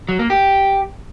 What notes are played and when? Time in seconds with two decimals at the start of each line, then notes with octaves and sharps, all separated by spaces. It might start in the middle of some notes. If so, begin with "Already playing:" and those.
0.09 F#3
0.19 A#3
0.30 G4